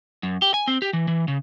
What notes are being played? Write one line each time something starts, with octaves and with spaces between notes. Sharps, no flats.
F#2
G4
G#5
C4
G4
E3
E3
C#3